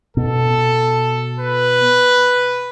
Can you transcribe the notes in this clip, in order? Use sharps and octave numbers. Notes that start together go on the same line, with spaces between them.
B2 A4
B4